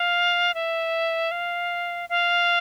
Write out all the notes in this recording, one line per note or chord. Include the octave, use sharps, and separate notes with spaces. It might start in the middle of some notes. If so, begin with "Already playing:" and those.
Already playing: F5
E5
F5
F5